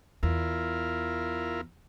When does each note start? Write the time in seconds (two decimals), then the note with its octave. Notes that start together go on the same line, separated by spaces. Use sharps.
0.23 E2 E4 F4 A#4